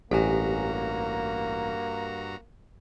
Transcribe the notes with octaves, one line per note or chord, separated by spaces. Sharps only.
A1 G2 A#3 F#4 G4 G#5 A#5